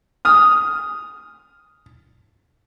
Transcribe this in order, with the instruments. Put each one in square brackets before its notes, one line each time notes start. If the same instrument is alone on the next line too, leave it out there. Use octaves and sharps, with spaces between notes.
[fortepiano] D#6 F6